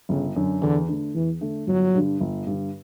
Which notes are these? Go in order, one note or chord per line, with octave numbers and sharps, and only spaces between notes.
G1 C#3
F#2 D3
E2 D3
D3 A3
E2 E3
D3 A3
G1 F#3
G2 D3
G1
G2 D3